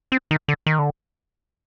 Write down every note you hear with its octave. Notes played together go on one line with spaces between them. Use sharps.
C4
D#3
D3
D#3
D3